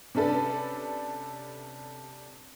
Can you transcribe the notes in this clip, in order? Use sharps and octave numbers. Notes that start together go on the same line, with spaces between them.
C3 C#4 D4 A4 B4